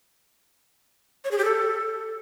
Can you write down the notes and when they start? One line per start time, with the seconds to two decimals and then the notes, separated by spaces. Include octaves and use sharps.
1.25 C#5
1.31 G#4
1.38 G4
1.45 A4